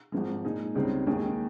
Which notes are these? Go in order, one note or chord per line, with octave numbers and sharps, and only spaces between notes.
G#1 G#2 F3 G#3
A#2 G#3 D#4 G#4
C#2 C#3 G3 C4 D#4
D#2 D#3 G#3 D#4 G#4